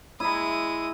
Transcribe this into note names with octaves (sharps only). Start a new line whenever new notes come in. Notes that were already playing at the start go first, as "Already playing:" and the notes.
G#3 E4 E5 A#5 D#6